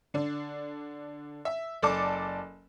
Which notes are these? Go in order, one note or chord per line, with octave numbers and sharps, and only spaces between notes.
D3 D4
E5
F#1 A4 D5 A5 D6